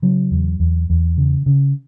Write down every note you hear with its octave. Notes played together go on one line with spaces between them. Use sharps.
C#3 F#3
E2
E2
E2
C#3
C#3